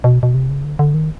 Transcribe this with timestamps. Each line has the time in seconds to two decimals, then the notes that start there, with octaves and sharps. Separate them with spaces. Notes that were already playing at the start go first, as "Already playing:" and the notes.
0.04 B2
0.23 B2
0.35 C3
0.50 C#3
0.64 D3
0.79 D3
0.94 D#3